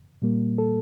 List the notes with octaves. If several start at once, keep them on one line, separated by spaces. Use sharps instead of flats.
A#2 G3 A#3
A4